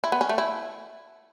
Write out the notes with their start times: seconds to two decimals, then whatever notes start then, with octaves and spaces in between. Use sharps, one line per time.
0.04 E4
0.12 B3
0.21 C#4
0.29 A3
0.38 E4